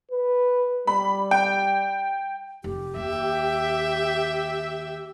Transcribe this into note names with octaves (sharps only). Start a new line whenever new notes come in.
B4
G3 B5
G5
F1 G4
D#2 E5 G5